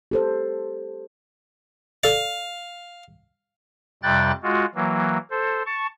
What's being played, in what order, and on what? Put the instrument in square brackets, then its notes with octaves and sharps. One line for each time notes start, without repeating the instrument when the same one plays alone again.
[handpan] G4 A4 C5
[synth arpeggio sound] A4 D5 [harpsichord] F5
[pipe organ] F2 C3 G3 G5 F#6 A6
G#3 F4 F#4
E3 F#3 A#3
A4 C5
A5 C#6